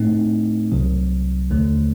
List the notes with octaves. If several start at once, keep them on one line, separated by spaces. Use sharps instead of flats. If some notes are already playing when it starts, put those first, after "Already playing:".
Already playing: A2 A3 C4 D#4
C2 C3 F#3
D#2 D3 A3